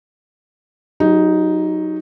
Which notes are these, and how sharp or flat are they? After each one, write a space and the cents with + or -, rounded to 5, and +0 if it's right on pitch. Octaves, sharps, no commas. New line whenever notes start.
F#3 +0 D#4 +5 G4 +45